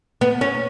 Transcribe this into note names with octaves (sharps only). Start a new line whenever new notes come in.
B3
C#4